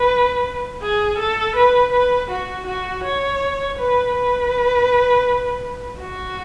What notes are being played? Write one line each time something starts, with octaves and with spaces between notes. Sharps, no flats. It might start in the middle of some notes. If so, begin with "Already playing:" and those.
Already playing: B4
G#4
A4
B4
B4
F#4
F#4
C#5
B4
B4
F#4